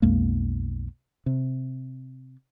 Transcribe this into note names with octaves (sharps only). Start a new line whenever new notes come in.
B1 F2 G#3 A#3
C3